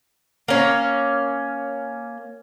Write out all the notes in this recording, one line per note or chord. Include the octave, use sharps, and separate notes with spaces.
A#3 C#4